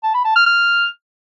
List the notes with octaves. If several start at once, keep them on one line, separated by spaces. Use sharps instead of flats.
A5
B5
A5
F6
F6